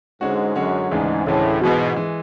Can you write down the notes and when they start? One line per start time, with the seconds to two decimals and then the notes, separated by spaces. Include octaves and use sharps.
0.21 G#2 D3 G#3 C#4 F#4
0.55 F#2 D3 G#3 C#4 F#4
0.91 D2 G#2 C#3 E3 G#3 D4
1.26 D2 A2 C#3 E3 G#3 D4
1.61 G#2 B2 E3 G#3
1.96 E3 G#3